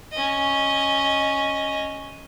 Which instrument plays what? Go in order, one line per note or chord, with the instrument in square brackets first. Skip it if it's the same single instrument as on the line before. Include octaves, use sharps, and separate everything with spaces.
[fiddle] C#4 D#5